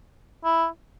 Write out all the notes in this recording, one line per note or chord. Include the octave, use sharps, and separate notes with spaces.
E4